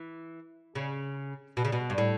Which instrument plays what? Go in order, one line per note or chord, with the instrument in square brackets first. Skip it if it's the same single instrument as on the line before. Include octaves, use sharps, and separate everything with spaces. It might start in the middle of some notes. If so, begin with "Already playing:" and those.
Already playing: [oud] E3
C#3
B2
C#3
B2
G2
A2